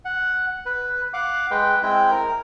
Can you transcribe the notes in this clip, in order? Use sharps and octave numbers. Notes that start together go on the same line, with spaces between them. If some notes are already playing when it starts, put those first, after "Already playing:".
F#5
B4
F5 F#5 D6
G#3 B4 G5
G#3 C4 E4 G5
A#4